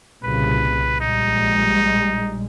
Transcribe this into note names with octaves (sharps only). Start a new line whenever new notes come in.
C2 A#2 C#3 B4
A#1 G3 G#3 D#4